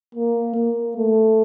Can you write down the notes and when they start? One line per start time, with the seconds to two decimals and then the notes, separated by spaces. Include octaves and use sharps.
0.15 A#3
0.56 A#3
0.96 A3